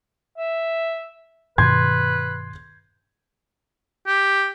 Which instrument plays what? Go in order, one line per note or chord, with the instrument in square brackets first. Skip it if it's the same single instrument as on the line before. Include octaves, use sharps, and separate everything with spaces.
[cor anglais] E5
[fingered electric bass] G2 B2 D#3 [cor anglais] B4 [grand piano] C6 G6 G#6
[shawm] G4